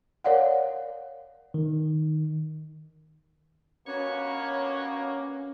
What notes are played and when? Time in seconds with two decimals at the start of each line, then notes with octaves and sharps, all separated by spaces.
0.24 A#4 C#5 D5 F5 F#5
1.54 D#3
3.87 G2 B2 A#3 C#4 F#4 B4 C#5